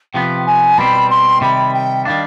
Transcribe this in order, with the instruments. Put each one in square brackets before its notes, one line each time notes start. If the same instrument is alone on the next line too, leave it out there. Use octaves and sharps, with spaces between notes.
[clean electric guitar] C3 F3 B3 [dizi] G5
[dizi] G#5
[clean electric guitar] B2 G3 C4 [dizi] B5
[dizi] C6
[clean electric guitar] C3 D#3 G3 [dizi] B5
[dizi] G5
[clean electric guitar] D#3 G3 D4 [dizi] F5